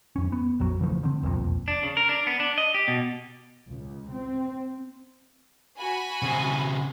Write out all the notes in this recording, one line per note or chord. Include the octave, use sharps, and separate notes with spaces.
F2 C#4
B3
A#1 F2 F#3
C#3 E3 F3 A3
D3 C4
E1 C2 F2 A#2
D4
C#3
A#4
D4
B3
D4
D#5
G4
B2
C#2
C4
F#4 G#5 B5
C#3 C4